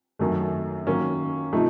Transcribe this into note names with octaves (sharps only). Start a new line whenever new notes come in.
F#2 D#3 F#3 A3
D#3 F#3 A#3 C#4
C3 F3 A3 D#4